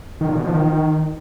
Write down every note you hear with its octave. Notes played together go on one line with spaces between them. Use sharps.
D#3
A#2
B2
F3
D#3